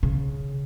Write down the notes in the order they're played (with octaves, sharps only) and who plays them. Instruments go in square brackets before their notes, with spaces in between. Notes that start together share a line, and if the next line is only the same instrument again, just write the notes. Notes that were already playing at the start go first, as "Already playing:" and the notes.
[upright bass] C#3